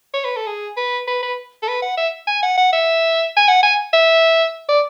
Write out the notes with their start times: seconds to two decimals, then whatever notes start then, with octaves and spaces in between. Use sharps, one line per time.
0.14 C#5
0.24 B4
0.36 A4
0.46 G#4
0.77 B4
1.07 B4
1.22 B4
1.63 A4
1.68 B4
1.82 F#5
1.97 E5
2.27 G#5
2.43 F#5
2.57 F#5
2.73 E5
3.36 G#5
3.48 F#5
3.63 G#5
3.93 E5
4.69 D5